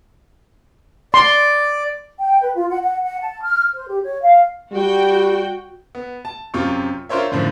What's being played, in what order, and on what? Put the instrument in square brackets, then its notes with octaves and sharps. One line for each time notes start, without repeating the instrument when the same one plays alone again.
[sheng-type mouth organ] D5 [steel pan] C6
[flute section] G5
B4
F4
F#5
F#5
F#5
A5
F6
C5
G4
C#5
F5
[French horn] G3 [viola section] F#4 G5
[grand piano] B3
A5
F#2 C3 F4 C#6
D4 F4 A#4 C5 C#5 E5
F#2 A2 D3 F3 A3